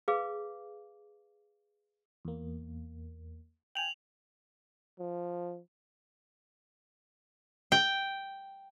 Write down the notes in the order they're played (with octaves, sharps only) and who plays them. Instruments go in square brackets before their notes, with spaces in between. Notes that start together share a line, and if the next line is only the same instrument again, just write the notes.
[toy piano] G#4 B4 F5 D6
[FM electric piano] E2 A#3
[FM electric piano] G5 G#5 [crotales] F7 F#7
[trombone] F3
[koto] G5